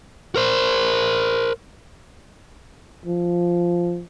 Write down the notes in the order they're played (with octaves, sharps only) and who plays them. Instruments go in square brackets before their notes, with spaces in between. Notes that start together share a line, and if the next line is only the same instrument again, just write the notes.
[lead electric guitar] A#4 C5
[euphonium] F3